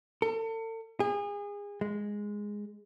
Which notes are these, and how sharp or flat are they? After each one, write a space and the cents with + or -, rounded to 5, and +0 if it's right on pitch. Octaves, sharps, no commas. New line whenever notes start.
A4 +40
G#4 -30
G#3 -5